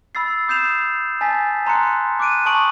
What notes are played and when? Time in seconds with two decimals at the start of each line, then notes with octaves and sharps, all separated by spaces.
0.15 B5 E6 A6 C7
0.49 D#6 G6 C7 E7 F7
1.21 G#5 A5 A6 B6
1.66 A5 A#5 C6 F#6 C#7
2.20 D6 F#6 D7 D#7
2.46 A5 C#6 D#6 D7 F#7